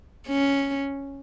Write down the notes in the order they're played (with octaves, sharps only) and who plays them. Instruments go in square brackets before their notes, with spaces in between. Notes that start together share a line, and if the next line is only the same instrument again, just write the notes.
[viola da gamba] C#4